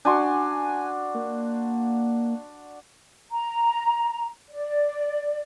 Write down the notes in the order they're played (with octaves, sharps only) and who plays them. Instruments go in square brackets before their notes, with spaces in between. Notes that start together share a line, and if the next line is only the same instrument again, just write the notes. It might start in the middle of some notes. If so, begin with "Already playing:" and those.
[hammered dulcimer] D4 F#4 C6 [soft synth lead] G#5
[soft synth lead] A#3
[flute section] A#5
D5